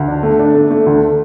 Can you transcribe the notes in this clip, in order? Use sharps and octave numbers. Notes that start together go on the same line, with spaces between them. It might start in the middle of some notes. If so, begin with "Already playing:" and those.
Already playing: D2
D4
A3
D4
A3
A3
D2